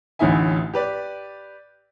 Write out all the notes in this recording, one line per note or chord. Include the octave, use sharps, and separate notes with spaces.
A1 D2 A2 D#4 E5 G#5
G4 B4 D5